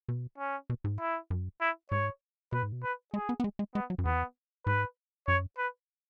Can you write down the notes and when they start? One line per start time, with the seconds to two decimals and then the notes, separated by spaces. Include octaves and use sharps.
0.08 B2
0.38 C#4
0.70 B2
0.84 G#2
0.99 E4
1.30 F#2
1.61 E4
1.91 G#2 C#5
2.52 B2 B4
2.63 G#2
2.72 B2
2.83 B4
3.14 G#3 G#4
3.29 B3
3.40 B3
3.44 G#3
3.59 G#3
3.75 G#3 B3
3.90 F#3
3.98 F#2
4.05 E2 B3
4.66 G#2 B4
5.28 F#2 C#5
5.58 B4